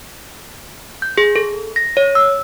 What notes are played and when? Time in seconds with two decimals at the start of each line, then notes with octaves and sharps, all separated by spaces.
1.02 G6
1.18 G#4
1.36 A4
1.76 A#6
1.97 C#5
2.15 E6